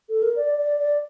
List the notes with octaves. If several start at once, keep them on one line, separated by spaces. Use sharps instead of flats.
A4
A#4
D5
D5
D5